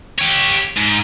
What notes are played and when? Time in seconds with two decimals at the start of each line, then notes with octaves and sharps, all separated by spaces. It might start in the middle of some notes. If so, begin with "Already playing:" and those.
0.19 G4 C#5
0.77 G#2